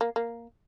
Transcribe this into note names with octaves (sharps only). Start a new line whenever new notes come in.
A#3
A#3